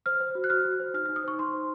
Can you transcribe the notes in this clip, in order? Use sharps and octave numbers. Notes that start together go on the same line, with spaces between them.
C5 F6
C5
F#4
F#6
F#4 F6
F#4
C5
D#4 F6
F6
D#4
D#6
C5 C#6
D#4 C6
C5